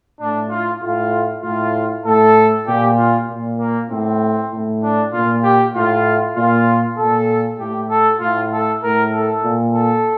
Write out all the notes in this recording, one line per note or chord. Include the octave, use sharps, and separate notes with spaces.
A2 D4
F4
A2 F4
A2 F4
A2 A4
A#2 G4
F4
A#2
A#3
A2 C4
A2
D4
A#2 F4
G4
A2 F4
A#2 F4
A#2 A4
A2 G4
A4
A2 F4
A4
A2 A#4
A4
A#2
A4